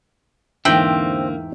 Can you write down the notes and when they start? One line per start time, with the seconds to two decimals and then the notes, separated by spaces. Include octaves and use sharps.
0.65 E2 G#2 D3 A#3 C4 E5 G5